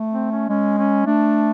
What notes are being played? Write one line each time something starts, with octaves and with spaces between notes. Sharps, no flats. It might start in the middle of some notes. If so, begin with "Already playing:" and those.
Already playing: A3
C4
C#4
G#3 C#4
C#4
A3 D4